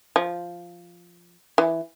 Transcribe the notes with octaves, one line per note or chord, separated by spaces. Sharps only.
F3
E3